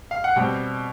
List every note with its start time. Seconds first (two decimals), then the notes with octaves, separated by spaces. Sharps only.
0.11 F5
0.24 F#5
0.36 B2 G3 C4 G5